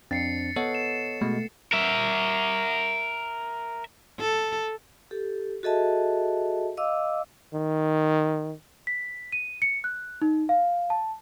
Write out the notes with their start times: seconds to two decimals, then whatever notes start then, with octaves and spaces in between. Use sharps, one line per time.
0.11 F2 C4 D4 A6 C7 C#7
0.56 B3 A4 C#5 D#5 F#5
0.75 E7
1.21 B2 G#3 A3
1.73 A#4 E5
4.20 A4
5.11 G4 A4
5.63 F#4 G#4 A4 D#5 E5 A5
6.77 D#5 F5 D6 E6
7.54 D#3
8.87 B6
9.32 D#7
9.62 C#7
9.84 F#6
10.22 D#4
10.49 F5
10.90 A5